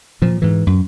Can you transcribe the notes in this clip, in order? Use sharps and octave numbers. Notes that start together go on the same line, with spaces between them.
A#2 F3
G#2 E3
F#2